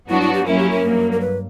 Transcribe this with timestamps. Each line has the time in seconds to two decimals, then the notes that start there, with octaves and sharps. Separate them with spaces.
0.09 G2 F#3 B3 D4 E4 F#4
0.21 E4
0.34 G4
0.46 F#3 A#3 C#4 E4 A#4
0.58 G4
0.70 A#4
0.84 G2 F#3 A#3
1.12 A#4
1.21 B4